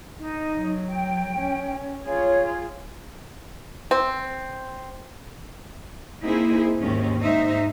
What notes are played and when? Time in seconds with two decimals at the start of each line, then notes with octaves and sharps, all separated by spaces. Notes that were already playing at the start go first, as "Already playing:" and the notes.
0.19 D#4
0.57 F#3
0.89 G5
1.39 C#4
2.06 F4 G#4 C#5
3.91 C4
6.22 A#3 C4 D#4 E4 G#4 C5
6.80 D#2 G#2 D#3 C4 C#4
7.22 G#2 D#4 C5 E5